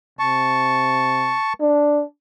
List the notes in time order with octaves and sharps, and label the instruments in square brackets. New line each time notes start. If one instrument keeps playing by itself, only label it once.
[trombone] C3 [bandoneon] A5 C#6
[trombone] D4